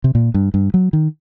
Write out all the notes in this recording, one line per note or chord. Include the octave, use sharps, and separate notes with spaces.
C3
A#2
G2
G2
F#3
D#3